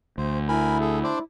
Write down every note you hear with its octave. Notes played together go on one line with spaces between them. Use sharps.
D2 C5
E4 A#4 G#5 B5
G#4 A4
D4 C5 D5